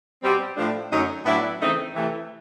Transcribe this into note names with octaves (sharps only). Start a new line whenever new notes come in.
B2 G3 C4
A2 F3 A3 D4
F#2 D3 F#3 A3 C#4 D#4
A2 F#3 B3 D4 E4
C#3 E3 A3 C4 D#4
C3 E3 A3